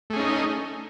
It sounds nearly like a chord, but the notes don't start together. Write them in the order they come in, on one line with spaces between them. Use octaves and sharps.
A3 G#4 C#4 D#4